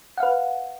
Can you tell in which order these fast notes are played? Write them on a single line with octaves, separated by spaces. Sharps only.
F#5 F5 B4